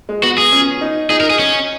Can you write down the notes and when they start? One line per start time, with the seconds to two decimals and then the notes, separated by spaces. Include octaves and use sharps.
0.09 G#3
0.23 B3 F#4
0.38 G#4
0.52 C#4
0.81 D#4
1.10 D#4 G#4
1.20 A#4
1.30 G#4
1.39 C#4